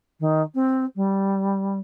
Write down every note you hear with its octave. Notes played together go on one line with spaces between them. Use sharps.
D#3
C4
G3